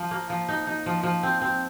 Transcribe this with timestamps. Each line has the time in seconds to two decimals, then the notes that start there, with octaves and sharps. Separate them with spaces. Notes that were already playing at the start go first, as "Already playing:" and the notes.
Already playing: F3
0.11 A#3
0.30 F3
0.49 D#4
0.67 D#4
0.86 F3
1.03 F3
1.23 C4
1.41 C4